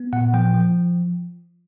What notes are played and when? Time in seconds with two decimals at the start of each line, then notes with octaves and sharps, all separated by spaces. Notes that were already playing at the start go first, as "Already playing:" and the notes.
Already playing: B3
0.13 A#2 F#5
0.34 F3 G5
0.54 F3